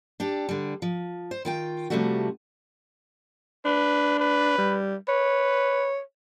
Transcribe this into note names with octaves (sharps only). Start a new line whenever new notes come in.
D4 G4 A4
D3 G3
F3
C5
D#3 F4 G5
C3 D#3 F3 G3 A3 F#4
D4 B4
B4
G3
B4 C#5